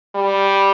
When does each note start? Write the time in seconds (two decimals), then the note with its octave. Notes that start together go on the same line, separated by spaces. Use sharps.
0.15 G3